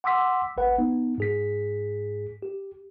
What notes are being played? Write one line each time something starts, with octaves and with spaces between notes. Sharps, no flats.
F#5 C6 D6 E6 B6
G#1 C#2 B4 F#5
B3 D#4
G#2 G#4 B6
G4